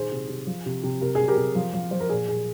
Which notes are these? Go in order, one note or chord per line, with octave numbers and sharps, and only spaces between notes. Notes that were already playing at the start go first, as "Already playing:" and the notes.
Already playing: A#2 D#3 G#4 C5
C3
C3
F3
C3
C3
C3 A#4
G#4
C3
G4 A#4
C3
F3
F3
F3 C5
A#4
A#2 G#4
A#2 G#4